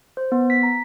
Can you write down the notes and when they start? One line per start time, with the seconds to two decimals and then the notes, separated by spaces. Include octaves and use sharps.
0.17 C5
0.32 B3
0.50 B6
0.63 A#5